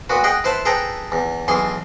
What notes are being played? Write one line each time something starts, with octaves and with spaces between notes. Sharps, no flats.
A#2 B3 F#4
G#4 D#5 F#5 G5
E4 B4 C5 A5
G#4 A4 B4 G5 A#5
E2
B1 E3 G#4 C6